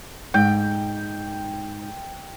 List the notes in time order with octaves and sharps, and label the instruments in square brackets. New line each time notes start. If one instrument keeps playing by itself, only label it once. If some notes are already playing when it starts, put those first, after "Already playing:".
[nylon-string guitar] G#2 [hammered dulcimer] G5